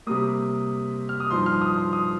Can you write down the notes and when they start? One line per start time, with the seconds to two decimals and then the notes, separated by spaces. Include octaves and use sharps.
0.07 C3 G3 A#3 D#6
1.09 F6
1.20 D#6
1.30 G2 F3 D#4 C6
1.46 F6
1.61 D#6
1.78 C6
1.93 D#6